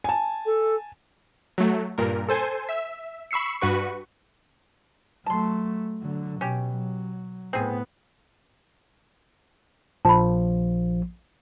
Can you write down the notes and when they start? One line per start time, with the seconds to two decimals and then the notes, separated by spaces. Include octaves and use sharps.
0.04 G#5 A5
0.46 A4
1.58 F#3 A3
1.98 G2 A#2 A#4
2.29 A4 C5 G#5
2.69 E5
3.31 B5 C#6 E6 C7 C#7
3.61 G2 F#4 B4 C#6
5.26 F#3 A3 A5 C6
6.01 D3 F#3
6.41 B2 C#4 G4
6.72 F#3
7.53 A2 B3 C4 G#4
10.05 A#1 F3 A5 B5